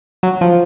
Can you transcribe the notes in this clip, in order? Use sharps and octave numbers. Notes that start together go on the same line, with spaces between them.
F#3
F3